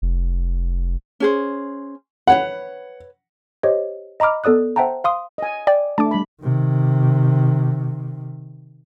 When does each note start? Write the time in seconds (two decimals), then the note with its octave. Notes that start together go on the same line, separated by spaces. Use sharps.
0.02 F1
1.20 C#4 G#4 C5
2.27 B4 C#5 F#5 B5
3.63 G4 C5 C#5 D#5
4.20 D#5 A#5 B5 D6 F6
4.44 B3 A4 D5 D#6 F#6
4.76 C5 E5 F#5 G5 A5 A#5
5.04 F5 C6 D#6
5.38 D#5 G#5
5.67 D5 G5
5.98 A3 D4 E5 A5 D6
6.11 G3 B5
6.42 C3 D#3